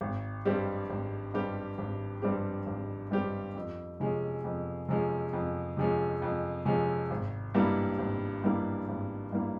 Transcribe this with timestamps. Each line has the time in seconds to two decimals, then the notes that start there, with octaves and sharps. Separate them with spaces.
0.01 G#1
0.45 G2 G3 C4 G4
0.90 G#1
1.34 G2 G3 C4 G4
1.78 G#1
2.22 G2 G3 C4 G4
2.67 G#1
3.11 G2 G3 C4 G4
3.55 F2
4.00 C3 F3 G#3 C#4
4.44 F2
4.88 C3 F3 G#3 C#4
5.33 F2
5.77 C3 F3 G#3 C#4
6.22 F2
6.65 C3 F3 G#3 C#4
7.11 G#1
7.54 G2 G3 A#3 E4
7.99 G#1
8.44 G2 G3 A#3 E4
8.88 G#1
9.32 G2 G3 A#3 E4